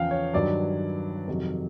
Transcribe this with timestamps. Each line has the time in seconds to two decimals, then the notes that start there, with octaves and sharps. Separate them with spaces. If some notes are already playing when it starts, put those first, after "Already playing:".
Already playing: E2 C#3 F3 F5 G5
0.11 C#5
0.33 G2 D#3 F#3 D5
1.27 F2 C3 D#3 F#3